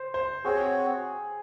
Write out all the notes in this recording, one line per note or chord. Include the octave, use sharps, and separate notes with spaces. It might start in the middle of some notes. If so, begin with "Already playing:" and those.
Already playing: C5
C5
C4 F#4 G#4 C#5